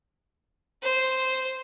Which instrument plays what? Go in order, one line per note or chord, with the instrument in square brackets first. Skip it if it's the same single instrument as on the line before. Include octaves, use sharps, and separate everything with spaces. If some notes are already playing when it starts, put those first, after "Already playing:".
[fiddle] C5